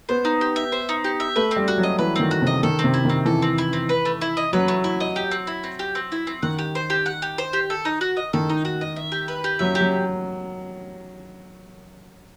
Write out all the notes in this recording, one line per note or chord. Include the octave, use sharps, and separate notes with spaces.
B3 C5
D#4
G4
E5
C5
D#4
G4
E5
A3 B4
C4
G3
F#4
F#3
D#5
E3 B4
D#3 C4
F#4
C3 D#5
D#3 A4
C4
C3
E4
D#3 C4
E3 A4
C4
E4
C4
B4
A3
E4
D#5
F#3 B4
A3
E4
D#5
G4
C4
E4
C4
G4
C4
E4
C4
D#3 F#5
G4
C5
G4
F#5
G4
C5
G4
A4
D#4
F#4
D#5
D#3 A4
D#4
F#4
D#5
E5
G4
B4
G4
F#3 E5
G4
F#3